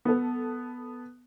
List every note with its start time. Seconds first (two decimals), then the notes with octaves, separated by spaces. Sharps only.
0.05 B3 A4